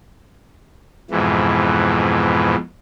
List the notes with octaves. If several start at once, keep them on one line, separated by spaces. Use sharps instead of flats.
F2 G#2 B2 E3